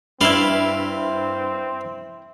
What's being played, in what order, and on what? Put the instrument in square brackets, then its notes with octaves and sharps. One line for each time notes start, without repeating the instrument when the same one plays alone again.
[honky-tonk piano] G2 [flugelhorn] C4 [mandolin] E4 E5 B5 [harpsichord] D5 F5 C6